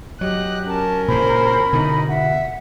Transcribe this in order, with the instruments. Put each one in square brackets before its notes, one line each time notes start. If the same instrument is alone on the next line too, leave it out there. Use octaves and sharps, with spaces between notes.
[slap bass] F#3 [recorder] G4 [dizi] D#5 [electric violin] F#6
[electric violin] C#4 A#4 [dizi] A5
[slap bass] A#2 C#3 E3 [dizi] C5 [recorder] B5
[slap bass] B2 D3 E3 [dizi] D#4
[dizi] E5 [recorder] F#5